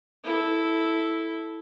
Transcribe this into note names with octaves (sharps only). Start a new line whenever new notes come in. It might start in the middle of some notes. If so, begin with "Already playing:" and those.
E4 A4